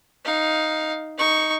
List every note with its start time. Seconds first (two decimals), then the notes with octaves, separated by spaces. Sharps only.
0.25 D#4 F5
1.18 D#4 C#6